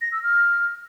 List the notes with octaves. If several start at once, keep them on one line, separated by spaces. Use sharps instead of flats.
A#6
E6
F6